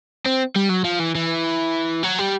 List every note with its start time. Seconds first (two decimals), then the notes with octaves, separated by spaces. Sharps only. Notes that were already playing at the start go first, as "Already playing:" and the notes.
0.26 C4
0.56 G3
0.70 F#3
0.84 F3
1.00 E3
1.15 E3
2.03 F#3
2.19 G3